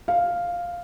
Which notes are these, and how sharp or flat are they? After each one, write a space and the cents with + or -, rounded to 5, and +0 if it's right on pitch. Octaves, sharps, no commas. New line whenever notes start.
F5 +0